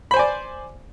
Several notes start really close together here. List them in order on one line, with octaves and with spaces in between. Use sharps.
B5 C5 G#5 D5